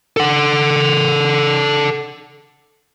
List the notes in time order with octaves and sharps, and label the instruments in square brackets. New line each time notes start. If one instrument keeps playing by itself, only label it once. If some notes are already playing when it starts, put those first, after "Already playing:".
[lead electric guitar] A4 F#5